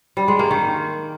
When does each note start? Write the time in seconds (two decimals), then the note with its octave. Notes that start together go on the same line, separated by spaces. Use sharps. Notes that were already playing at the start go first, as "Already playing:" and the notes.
0.17 G3
0.28 G#3
0.39 A#3
0.51 D#3